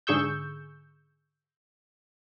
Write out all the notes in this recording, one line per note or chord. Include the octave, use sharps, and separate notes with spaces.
G#2 D3 G#4 C#6 E6 G6